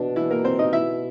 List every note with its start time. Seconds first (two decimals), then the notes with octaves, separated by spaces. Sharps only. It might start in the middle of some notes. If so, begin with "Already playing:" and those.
Already playing: B2 D4
0.16 E3 E4
0.30 A#3 A#4
0.44 C4 C5
0.59 D#4 D#5
0.73 E4 E5